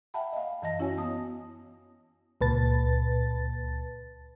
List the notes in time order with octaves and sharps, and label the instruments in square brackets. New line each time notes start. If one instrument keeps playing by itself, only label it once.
[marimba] E5 F#5 G5 A5 B5
D#5 F5
F#2 E3 D#5 A5 A#6
C#4 E4 F#4 C#5 G#5
B3 A5 D#6
[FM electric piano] C#2 A#2 B4 A5 A6